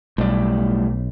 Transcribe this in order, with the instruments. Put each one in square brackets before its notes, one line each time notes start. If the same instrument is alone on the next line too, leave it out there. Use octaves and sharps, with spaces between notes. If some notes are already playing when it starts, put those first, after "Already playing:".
[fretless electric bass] B1 [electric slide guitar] A2 G3 D5